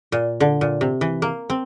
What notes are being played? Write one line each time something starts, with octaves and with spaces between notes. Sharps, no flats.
A#2
D3
A#2
C3
E3
A#3
C4